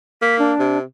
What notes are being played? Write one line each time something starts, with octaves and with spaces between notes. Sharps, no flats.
A#3 B6
D4
C3